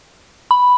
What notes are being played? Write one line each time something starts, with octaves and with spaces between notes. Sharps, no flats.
B5